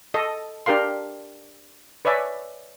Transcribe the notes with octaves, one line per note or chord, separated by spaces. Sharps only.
A4 D#5
D4 G4 A#4 F5 C6
B4 C#5 D5 E5 G#5